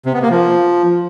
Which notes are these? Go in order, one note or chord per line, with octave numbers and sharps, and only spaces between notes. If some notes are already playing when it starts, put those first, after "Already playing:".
C3
B3
A#3
F3